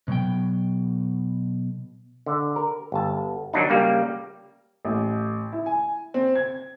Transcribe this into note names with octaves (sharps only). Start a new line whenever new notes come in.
B2 F#3 B3 G5
D3
A#4
G1 A5
D#3 F#3 D4 D#4
C#3 G3 A#3
A1
E4
G#5
C4
G#6